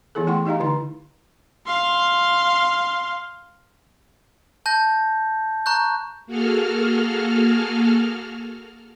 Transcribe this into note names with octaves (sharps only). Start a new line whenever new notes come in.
E3 B3 E4 G#4 A4
A3 E4 F#5 G5 C6 C#6
D#4 G4 D#5 F5 A#5
D3 D#4 E4 C6
F5 C6
A5 G6 A#6
A#5 C#6 F#6 G6
A#3 F#4 G#4 A4 F6